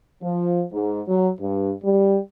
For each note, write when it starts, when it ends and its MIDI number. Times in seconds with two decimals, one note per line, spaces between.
0.23 0.62 53
0.72 1.01 44
1.08 1.29 54
1.39 1.72 43
1.84 2.18 55